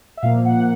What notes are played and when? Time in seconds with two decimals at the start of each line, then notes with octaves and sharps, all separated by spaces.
0.17 E5
0.23 A#2 F3 A#3 F5
0.45 F#5